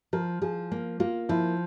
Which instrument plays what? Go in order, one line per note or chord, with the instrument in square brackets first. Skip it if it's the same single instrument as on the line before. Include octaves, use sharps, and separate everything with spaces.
[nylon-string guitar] F3 [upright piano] A#4
[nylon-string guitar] F3 [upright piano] G#4
[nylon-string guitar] A#3
[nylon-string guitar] A#3 [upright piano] F4
[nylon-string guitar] F3 [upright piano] E4